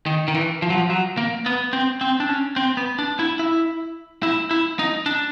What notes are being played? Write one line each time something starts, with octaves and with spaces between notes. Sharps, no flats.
D#3
D#3
E3
F3
F#3
F3
F#3
A#3
B3
C4
C4
D4
C#4
C4
B3
D4
E4
E4
E4
E4
D#4
D4